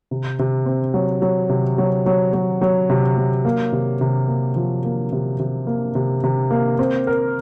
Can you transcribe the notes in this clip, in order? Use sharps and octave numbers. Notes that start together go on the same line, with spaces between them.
C3
C3
C4
F#3
F#3
C3
F#3
F#3
F#3
F#3
C3
F#3
A#3
C3
C3
A#3
F3
A#3
C3
C3
A#3
C3
C3
A#3
C4
A#4